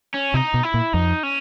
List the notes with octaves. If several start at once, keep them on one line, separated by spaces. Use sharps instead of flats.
C#4
C3 D#4
B2
E4
A#2
F2 D#4
C#4